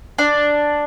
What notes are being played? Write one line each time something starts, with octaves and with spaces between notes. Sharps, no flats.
D4